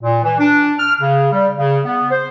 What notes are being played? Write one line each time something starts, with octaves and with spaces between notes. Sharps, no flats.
A#2
E3
D4
F6
C#3
G3
C#3
B3
C5